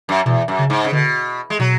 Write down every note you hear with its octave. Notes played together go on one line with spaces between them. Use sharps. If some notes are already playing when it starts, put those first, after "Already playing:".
F#2
E2 B2
F#2
C#3
G#2
C#3
B2 D3
G#3
B2 F#3